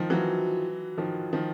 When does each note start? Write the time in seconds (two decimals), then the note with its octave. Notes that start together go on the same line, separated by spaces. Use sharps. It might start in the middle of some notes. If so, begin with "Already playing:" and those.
Already playing: D#3 F3
0.10 E3 F#3
0.98 D#3 F3
1.33 D#3 F3